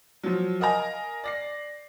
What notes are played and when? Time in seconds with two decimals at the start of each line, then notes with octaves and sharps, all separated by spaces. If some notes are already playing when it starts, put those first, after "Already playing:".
0.23 F3 F#3
0.60 A#4 D#5 F5 G#5 A#5
1.24 D5 A#6 C7